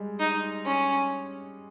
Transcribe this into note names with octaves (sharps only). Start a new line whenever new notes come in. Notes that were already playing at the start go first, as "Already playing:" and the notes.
Already playing: G3 G#3
D#4
C#4